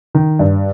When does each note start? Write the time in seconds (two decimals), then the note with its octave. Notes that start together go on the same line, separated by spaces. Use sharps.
0.15 D#3
0.39 G2